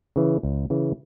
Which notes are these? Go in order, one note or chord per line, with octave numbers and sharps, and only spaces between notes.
C#3 E3
C#2
C#3 E3